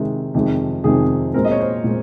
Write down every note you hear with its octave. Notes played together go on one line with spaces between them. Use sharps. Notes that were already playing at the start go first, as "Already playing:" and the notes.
Already playing: C3 D#3 G#3
F2 C3 D#3 G#3
F2 C3 D#3 G#3 G#4
A#2 G#3 C4 A#4
D#5
C#5
C5
A#2 G#3 C4